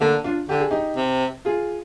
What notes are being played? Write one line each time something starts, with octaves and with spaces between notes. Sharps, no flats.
D3 A#3 D4
D4 F4
D3 G4
G#4
D#4 G4
C3
F4 G#4